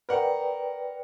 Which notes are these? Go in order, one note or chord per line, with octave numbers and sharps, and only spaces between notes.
A#4 B4 D5 F#5 G5